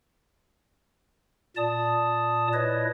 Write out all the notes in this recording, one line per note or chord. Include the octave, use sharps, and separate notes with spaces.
A#2 D5 A5 D#6
E4 B4 C#5 D#5